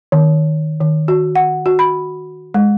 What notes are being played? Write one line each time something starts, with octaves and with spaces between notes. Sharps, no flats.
D#3
D#3
F#4
F#5
F#4
B5
G#3